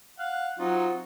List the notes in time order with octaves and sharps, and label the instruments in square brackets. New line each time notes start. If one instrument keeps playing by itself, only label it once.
[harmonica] F5 F#5
[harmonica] F#3 D#4 F4 [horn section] C4 F#4